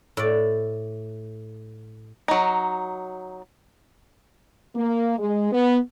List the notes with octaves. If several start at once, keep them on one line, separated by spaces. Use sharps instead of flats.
A2 D5
F#3 D#4
A#3
G#3
B3